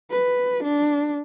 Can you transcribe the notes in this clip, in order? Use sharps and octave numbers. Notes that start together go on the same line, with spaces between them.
B4
D4